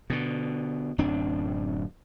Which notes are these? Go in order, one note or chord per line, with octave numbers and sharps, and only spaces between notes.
B2 D3
D1 F#2 C4 D4